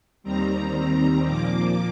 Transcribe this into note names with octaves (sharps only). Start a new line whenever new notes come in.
D#2 D#3 G3 C4 A#5
A#5
A#2 F3 A#3 D6